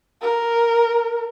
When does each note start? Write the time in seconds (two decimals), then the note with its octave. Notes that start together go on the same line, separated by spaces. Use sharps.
0.22 A#4